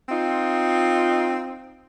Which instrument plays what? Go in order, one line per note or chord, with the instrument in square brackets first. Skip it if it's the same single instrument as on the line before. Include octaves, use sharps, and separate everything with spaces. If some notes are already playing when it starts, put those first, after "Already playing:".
[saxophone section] C4 D#4 F4